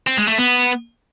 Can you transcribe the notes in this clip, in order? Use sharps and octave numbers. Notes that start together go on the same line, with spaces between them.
C4
G#3
A3
B3